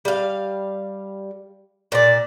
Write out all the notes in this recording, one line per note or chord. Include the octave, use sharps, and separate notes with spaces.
G3 F5
A#2 D5